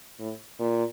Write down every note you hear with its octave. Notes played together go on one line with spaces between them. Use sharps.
A2
A#2